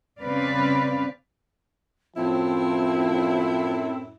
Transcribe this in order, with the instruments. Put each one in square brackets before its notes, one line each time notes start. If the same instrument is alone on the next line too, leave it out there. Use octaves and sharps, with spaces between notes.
[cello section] C#3 C4 B4 D5 F5
[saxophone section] F#2 A2 E4 [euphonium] F3 [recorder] C4